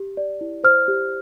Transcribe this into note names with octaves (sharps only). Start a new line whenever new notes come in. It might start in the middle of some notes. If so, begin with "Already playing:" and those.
Already playing: G4
D5
E4
C5 F6
G4